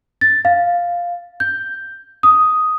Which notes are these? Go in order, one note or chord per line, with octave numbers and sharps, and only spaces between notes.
A6
F5
G6
D#6